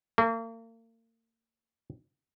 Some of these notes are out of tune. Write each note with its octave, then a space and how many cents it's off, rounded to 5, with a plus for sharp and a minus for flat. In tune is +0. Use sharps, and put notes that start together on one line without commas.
A#3 -40